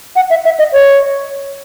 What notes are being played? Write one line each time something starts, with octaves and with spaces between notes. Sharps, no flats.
F#5
E5
E5
D#5
C#5